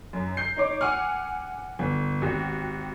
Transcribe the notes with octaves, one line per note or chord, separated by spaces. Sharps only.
F#2
G6 C7
D#4 C#5 D6
F#5 G#5 F6
G1
G#1 F#4 G4